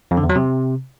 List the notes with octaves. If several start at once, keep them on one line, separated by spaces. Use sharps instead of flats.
F2
D3
E2
F#3
C3